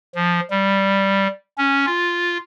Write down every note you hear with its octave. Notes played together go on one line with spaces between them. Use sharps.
F3
G3
C#4
F4